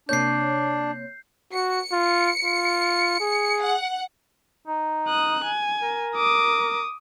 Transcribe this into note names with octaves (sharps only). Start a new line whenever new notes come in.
C3 A#3 D4 C#5 G6 C7
F#4 C#7
F4
F4
G#4
F#5
D#4
D#6 F#6
G#5
A#4
D6 D#6